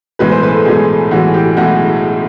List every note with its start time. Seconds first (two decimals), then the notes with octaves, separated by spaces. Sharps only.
0.19 B1 A2 E3 G#3 B4
0.31 C5
0.43 B4
0.54 A4
0.65 B1 A2 E3 G#3 G#4
1.11 B1 A2 E3 G#3 F#4
1.34 G4
1.57 B1 A2 E3 G#3 F#4